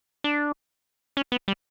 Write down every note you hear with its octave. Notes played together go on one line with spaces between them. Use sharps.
D4
C#4
B3
G3